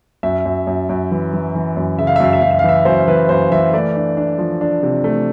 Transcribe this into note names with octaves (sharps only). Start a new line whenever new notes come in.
F#2 E5
F#2
F#2
F#2
E3
E3
E3
F#2
C#3 E5
F5
E5
F#2 F5
E5
F#2 F5
E5
F5
E3 E5
F#2 C5
E3 B4
F#2 C5
E3 E5
A3 D5
D4
D4
F3
D4
C3
A3